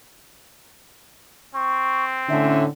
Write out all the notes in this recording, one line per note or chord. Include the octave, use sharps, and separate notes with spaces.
C4 C#6
A2 D3 C#4 E5